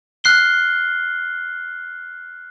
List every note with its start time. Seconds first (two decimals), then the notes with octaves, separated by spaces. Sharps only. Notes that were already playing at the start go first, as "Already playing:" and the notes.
0.24 F6 F#6 C7 G7